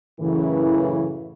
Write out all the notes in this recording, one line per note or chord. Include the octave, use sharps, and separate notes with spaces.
F#2 A2 C#3 E3